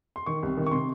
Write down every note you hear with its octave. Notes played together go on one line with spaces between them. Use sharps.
C6
D#3 C#6
C2
D#3
C#6
C3 C6